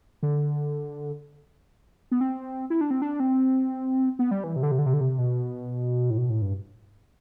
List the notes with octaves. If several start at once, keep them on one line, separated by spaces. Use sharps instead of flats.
D3
B3
C4
E4
D4
C4
D4
C4
B3
G3
E3
C3
D3
C3
D3
C3
D3
C3
B2
A2
B2
A2
G2